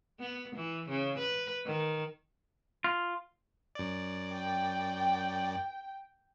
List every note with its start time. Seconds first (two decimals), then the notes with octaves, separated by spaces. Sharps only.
0.19 B3
0.55 E3
0.89 C#3
1.18 B4
1.65 D#3
2.84 F4
3.75 F#2 D5
4.32 G5